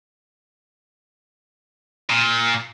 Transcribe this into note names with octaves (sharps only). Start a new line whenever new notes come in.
A#2